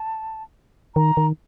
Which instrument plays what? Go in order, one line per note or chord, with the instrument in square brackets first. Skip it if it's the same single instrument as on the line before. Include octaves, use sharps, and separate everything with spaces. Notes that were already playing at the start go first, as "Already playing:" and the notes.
Already playing: [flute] A5
[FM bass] D#3 [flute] A#5
[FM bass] D#3